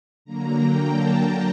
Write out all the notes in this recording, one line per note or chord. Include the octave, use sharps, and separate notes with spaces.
D3 F#3 A#3 A#5
G5
A5